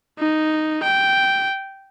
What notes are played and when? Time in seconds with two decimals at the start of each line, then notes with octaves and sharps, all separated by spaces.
0.19 D#4
0.83 G5